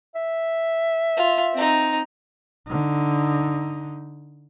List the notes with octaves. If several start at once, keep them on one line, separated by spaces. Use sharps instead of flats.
E5
F4
C4 D#4
D3 D#4